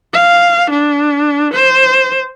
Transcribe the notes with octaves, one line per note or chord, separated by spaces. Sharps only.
F5
D4
C5